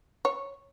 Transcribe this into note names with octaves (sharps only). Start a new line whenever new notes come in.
C#5